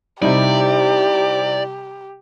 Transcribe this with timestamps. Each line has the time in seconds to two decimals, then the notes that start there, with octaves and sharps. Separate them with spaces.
0.22 C3 G3 D#4 E4 G4 D5